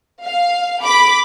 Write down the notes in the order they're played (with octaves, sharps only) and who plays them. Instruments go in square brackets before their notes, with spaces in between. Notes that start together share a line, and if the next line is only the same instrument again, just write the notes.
[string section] F5
B5 D6 B6